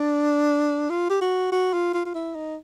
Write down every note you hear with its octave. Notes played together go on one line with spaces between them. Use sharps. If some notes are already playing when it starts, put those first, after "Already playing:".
Already playing: D4
F4
G4
F#4
F#4
F4
F4
F4
E4
D#4